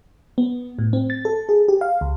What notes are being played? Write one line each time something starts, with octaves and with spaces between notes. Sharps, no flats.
B3
A2
C4
A6
A4
G#4
G4
F5
C#2